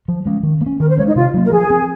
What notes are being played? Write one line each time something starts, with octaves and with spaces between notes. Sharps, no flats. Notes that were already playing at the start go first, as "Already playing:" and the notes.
F3
G#3 C#4
D#3
A#3
C#4
D#3 A#4
C5
G#3 C#4 C#5
D#4
C3 F4
F#3 A#3
A#4
F3 G#4
C4